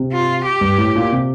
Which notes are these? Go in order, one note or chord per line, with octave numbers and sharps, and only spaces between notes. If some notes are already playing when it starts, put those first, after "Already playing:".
Already playing: C3
F4
G4
G2
A2
A#2
C3